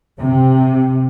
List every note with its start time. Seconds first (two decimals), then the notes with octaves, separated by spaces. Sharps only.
0.20 C3